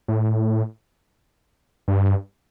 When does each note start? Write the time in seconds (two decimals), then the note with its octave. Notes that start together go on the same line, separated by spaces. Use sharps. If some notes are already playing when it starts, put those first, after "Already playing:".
0.08 A2
1.88 G2